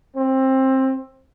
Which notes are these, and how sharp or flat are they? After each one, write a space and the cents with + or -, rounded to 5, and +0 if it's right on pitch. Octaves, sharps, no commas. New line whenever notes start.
C4 +20